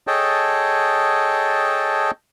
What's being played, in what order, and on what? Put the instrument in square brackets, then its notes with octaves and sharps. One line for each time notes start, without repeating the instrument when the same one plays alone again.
[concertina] G#4 A4 C#5 D#5 G5 A5